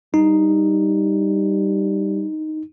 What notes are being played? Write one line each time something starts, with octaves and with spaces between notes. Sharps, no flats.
G3 D#4